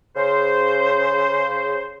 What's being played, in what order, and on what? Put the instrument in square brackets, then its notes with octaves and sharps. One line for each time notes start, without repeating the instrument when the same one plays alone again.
[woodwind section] C#3 C5